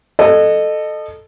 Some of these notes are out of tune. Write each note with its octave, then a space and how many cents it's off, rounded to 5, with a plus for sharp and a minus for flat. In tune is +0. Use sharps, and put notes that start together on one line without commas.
A4 +0 D#5 -25